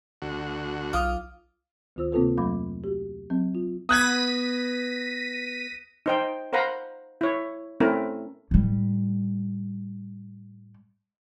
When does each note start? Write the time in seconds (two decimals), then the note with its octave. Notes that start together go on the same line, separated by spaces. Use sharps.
0.22 D2 F#4
0.93 B1 F4 D6 D#6 F6
1.96 D2 D#3 F4 C5 E6
2.12 C3 A#3 C4 F4 A4 B4
2.37 F2 F#3 A3 F5 B5 D6
2.84 F#4 G4
3.30 F#3 C4
3.55 F4
3.89 B3 D#6 F#6 G#6 A#6 B6 D#7
6.06 D#4 C5 G5
6.53 A#4 C5 F5 F#5 A#5 B5
7.21 E4 C#5
7.80 A3 C4 C#4 E4 A#4
8.51 A2 G3